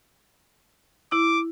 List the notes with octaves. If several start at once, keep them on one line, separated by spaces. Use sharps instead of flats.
E4 D6